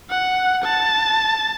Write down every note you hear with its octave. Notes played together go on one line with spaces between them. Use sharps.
F#5
A5